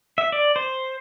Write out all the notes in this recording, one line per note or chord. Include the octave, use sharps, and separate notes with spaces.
E5
D5
C5